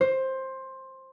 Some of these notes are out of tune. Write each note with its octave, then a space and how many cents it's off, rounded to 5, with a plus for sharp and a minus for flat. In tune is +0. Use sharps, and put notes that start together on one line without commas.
C5 +15